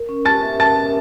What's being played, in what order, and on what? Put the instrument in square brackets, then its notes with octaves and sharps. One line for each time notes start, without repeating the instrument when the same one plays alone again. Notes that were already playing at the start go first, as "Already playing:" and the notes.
Already playing: [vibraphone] A#4
C#4
[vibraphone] G4 [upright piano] A5 A6
[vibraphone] E5
[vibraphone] A#4 [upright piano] A5 A6
[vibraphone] C#4